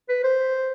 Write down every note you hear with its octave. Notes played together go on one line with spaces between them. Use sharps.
B4
C5